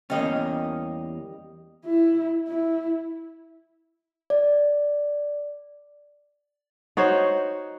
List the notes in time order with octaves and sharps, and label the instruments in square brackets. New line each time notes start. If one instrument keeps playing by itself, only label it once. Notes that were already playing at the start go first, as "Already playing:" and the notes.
[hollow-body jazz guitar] E2 A#3 C#4 [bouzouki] G3 D#5
[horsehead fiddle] E4
E4
[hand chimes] D5
[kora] D#4 F#4 C5 C#5